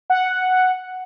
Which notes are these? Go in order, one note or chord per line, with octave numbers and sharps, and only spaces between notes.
F#5